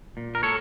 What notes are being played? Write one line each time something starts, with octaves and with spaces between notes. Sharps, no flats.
A#2
A#4
A4 C#5